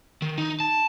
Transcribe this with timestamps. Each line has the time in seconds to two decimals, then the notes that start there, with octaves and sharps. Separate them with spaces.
0.22 D#3
0.38 D#4
0.60 A5